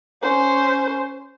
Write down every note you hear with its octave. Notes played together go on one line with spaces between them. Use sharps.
C#4 C5